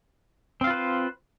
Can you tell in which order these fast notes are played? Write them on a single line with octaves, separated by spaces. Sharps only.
C4 F5 F4 B4 C5